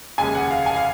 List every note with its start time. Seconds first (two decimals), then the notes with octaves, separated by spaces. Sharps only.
0.18 F1 D#2 C#3 G#3 G#5
0.35 F#5
0.51 F5
0.66 G#5
0.76 F5